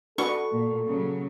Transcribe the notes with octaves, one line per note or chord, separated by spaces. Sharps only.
D4 F#4 A4 B4 C#6
A#2
C#3 F#3